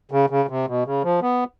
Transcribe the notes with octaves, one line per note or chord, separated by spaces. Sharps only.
C#3
C#3
C3
B2
C#3
F3
B3